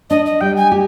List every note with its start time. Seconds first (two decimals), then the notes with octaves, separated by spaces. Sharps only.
0.10 D4 D#5
0.26 D#5
0.41 G3 G5
0.56 G#5
0.72 G4